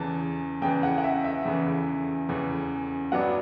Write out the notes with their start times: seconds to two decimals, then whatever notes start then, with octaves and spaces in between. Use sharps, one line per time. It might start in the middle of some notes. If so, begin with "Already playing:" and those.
Already playing: E2 C#3 E3 A5
0.62 E2 C#3 E3 G5
0.83 F#5
0.98 F#5
1.04 E5
1.25 E5
1.45 E2 C#3 E3
2.29 E2 C#3 E3
3.12 G2 F#3 B3 D4 F#5